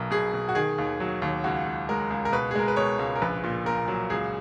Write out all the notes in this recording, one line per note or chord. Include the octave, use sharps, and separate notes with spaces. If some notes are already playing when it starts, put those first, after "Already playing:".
Already playing: B1 B2 A#4
B2 G#4
B2
F#4
D#3 G#4
D#2
F#3
D#2
C#2 F#4
C#2
G#3 A#4
C#2
A#4
B2 B4
G#4
G#3 A#4
B4
B2 C#5
C#2
A#4
A#1 B4
A#2
A#2 A#4
F#3
C#2 G#4